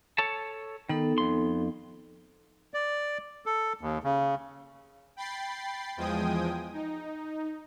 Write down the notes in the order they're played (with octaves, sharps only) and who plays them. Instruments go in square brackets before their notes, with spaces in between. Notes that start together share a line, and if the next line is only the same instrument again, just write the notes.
[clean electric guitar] A4 C#5 A5
[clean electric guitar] D#3 [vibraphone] B3 D#4 A4
[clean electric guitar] F2 C6
[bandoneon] D5
A4
D#2
C#3
[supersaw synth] G5 B5 A6 C7
E2 F3 G#3 G5 G#5 D#6
D#4